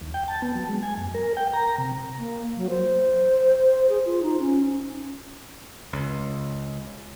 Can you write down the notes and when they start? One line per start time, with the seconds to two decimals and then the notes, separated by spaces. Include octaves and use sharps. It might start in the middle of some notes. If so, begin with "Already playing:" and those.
0.01 D#2
0.14 G5
0.28 A5
0.42 B3
0.55 F#3
0.69 G#3
0.83 G#5
0.97 F#2
1.14 A#4
1.37 G5
1.53 A#5
1.78 C3
2.18 A#3
2.57 F#3
2.70 C5
3.89 G#4
4.06 F4
4.23 D#4
4.40 C#4
5.93 C#2